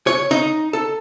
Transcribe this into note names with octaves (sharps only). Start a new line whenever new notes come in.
C#5
D#4
A4